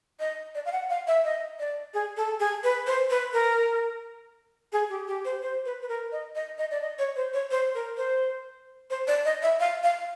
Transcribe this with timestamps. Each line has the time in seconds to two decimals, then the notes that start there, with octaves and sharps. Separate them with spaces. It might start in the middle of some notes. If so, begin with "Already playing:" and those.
0.20 D#5
0.55 D5
0.66 F5
0.72 F#5
0.90 F5
1.07 E5
1.24 D#5
1.59 D5
1.94 G#4
2.17 A4
2.40 G#4
2.64 B4
2.87 C5
3.10 B4
3.33 A#4
4.73 G#4
4.90 G4
5.08 G4
5.25 C5
5.42 C5
5.65 B4
5.82 B4
5.89 A#4
6.12 D#5
6.35 D#5
6.58 D#5
6.71 D5
6.81 D#5
6.99 C#5
7.16 C5
7.34 C#5
7.51 C5
7.75 A#4
7.97 C5
8.90 C5
9.08 D5
9.25 D#5
9.42 E5
9.60 F5
9.83 F5